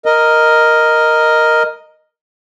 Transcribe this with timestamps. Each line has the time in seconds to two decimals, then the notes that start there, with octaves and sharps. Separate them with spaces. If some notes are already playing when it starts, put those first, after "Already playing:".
0.06 A#4 D#5